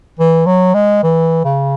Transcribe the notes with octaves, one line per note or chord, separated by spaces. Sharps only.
E3
F#3
G#3
E3
C#3